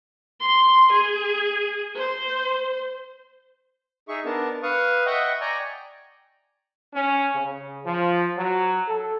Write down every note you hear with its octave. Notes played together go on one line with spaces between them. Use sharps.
C6
G#4
C5
D#4 G#4 E5 C#6
B3 D4 A#4 A5
B4 F5 C#6 D#6
D#5 E5 F#5 G5 C#6
D5 G5 G#5 A#5 C#6
C#4
C#3
F3
F#3
A4